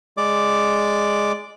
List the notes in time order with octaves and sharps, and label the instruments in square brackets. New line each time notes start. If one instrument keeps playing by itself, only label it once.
[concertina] G#3 D5 D6